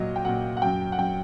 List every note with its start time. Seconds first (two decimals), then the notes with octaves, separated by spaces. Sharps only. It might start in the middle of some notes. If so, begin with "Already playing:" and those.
Already playing: A#2 F#3 D#5
0.16 G5
0.25 A#2 F#3 F#5
0.57 F#5
0.62 F#2 F#3 G5
0.92 F#5
0.98 F#2 F#3 G5